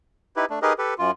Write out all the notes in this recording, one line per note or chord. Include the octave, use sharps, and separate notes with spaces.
D#4 E4 G4 B4
A3 D4
D#4 G4 G#4 A#4 B4 D#5
G4 A4 B4
F#2 F4